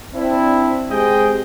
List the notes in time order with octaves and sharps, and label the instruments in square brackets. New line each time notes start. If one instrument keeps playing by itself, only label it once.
[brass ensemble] C4 D4 E4
G#3 C4 G4 G#4 D#5 G5